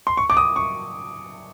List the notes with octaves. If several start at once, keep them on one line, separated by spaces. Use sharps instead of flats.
C6
C#6
D6
D#6
C#6